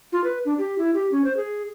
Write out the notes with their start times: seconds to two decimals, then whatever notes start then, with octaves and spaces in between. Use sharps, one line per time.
0.12 F4
0.24 B4
0.45 D4
0.58 G4
0.78 E4
0.94 G4
1.12 C#4
1.24 C5
1.37 G#4